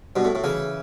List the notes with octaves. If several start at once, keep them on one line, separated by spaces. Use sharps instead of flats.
G2 B2
A2
A2
C#3 E3